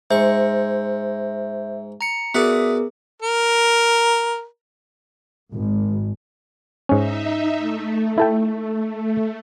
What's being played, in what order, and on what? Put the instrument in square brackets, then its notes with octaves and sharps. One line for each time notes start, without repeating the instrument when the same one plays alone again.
[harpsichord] G#2 C#6 [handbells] C5 [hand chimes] E5
[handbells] A#5 C#7
[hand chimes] B3 G#4 A#4 [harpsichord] F#4 D5 [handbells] E5 D#6
[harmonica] A#4
[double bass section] G#1
[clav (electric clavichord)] G#2 C#4 [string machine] D#4 E5
[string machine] A3
[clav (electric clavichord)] E4 A4 G5